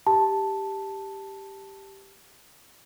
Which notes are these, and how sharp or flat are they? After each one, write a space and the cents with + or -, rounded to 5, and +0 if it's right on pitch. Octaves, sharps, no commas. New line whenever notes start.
G4 +0 A5 +0